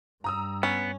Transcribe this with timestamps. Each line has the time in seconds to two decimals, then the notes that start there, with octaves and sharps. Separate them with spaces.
0.24 G2 A#5 D#6 E6
0.63 B3 C#4